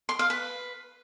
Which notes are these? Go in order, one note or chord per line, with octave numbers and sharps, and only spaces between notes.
C6
F5
B4